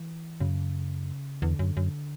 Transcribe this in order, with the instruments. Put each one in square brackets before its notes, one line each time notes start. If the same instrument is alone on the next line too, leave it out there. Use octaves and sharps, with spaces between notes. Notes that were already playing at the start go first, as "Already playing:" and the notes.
Already playing: [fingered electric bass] E3
[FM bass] F#2 [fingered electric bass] C#3
[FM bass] E2 [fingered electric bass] D3
[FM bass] F#2
F#2